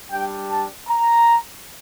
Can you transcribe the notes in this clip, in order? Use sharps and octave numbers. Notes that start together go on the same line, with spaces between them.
G3 D4 G4 G5
A5
A#5